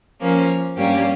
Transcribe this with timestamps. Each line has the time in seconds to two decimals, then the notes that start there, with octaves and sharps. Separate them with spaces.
0.20 F3 A#3 C#4
0.76 G2 G3 A#3 C#4 G4